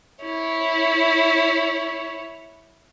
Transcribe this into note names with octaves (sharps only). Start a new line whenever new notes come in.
E4 C#5